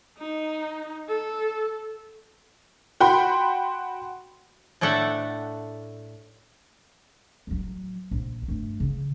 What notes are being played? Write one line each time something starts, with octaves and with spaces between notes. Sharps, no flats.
D#4
A4
F#4 G5 B5 C6
A2 A3 D4 A4 E5 F#5
A1 F#3
A#1
G2 A3
C#3